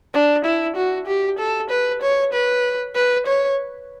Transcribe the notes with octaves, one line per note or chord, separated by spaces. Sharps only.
D4
E4
F#4
G4
A4
B4
C#5
B4
B4
C#5